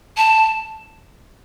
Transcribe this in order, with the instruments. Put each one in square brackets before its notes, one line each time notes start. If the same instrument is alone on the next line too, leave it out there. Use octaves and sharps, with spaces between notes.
[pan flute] A5